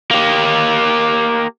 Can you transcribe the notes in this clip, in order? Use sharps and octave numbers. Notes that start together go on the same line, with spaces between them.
A#3 G4